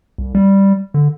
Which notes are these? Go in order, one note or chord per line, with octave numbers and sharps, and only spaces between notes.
C2
G3
D3